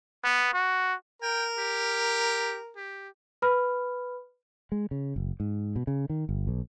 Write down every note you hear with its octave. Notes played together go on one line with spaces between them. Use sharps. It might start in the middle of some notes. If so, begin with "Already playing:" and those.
B3
F#4
A#4 G5
G4
G4
B4 B5 F6
G#3
C#3
F#1
G#2
B2
C#3
D#3
G1
B1